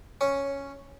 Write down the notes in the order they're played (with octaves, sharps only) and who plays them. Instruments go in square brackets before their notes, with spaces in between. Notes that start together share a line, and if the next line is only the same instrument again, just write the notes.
[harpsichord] C#4